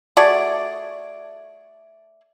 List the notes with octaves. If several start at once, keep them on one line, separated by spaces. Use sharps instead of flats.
A3 F#4 G#4 D5